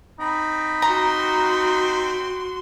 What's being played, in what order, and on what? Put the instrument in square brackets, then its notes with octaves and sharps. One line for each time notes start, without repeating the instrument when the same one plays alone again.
[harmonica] C4 B5 [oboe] D#4
[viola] F#4 C6 [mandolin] A#5